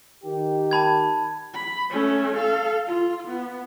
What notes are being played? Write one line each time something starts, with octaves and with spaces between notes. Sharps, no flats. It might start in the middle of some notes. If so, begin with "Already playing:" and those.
D#3 G4
A5 B5 G#6
B5
A3 C#4
A4 F5
F4
B3